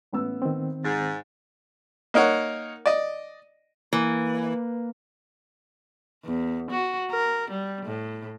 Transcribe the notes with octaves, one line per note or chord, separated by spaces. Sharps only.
A1 B3 E6
D#3 C4
G#2 A6
A#3 D#4 A#4 C#5 F#5
D5 D#5
E3 A#3
E2
F#4
A#4
G3
A2